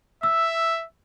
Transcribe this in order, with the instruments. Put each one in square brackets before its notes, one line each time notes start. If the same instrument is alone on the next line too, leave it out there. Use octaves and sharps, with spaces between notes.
[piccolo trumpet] E5 [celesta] E6